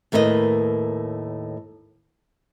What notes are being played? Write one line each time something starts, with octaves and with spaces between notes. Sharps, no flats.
D#2 A2 A#4 B4 D#5